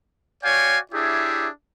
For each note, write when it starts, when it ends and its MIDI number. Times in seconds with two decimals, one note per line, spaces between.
0.44 0.78 66
0.44 0.78 73
0.44 0.78 74
0.44 0.78 77
0.44 0.78 79
0.44 0.78 80
0.92 1.46 62
0.92 1.46 64
0.92 1.46 67
0.92 1.46 68
0.92 1.46 73
0.92 1.46 76